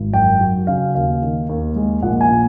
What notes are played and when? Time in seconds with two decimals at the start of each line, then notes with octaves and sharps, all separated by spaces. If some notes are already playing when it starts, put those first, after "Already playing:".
Already playing: G#1
0.14 F#2 G5
0.40 F#3
0.67 C#3 F5
0.95 D#2 F5
1.22 D#3
1.49 D#2
1.76 G#3
2.02 A#1 F#5
2.21 G#5
2.30 A#2